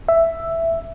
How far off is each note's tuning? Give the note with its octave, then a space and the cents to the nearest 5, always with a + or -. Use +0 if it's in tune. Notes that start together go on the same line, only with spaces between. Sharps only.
E5 +5